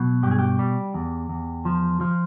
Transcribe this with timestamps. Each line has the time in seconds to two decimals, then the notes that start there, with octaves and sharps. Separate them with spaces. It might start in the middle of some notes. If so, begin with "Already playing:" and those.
Already playing: B2 F#3
0.23 G2 G4
0.31 G#4
0.39 G4
0.59 G3
0.94 E2
1.29 E2
1.65 F3
2.01 F3